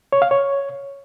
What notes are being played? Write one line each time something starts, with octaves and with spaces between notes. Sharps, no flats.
C#5
F5
C#5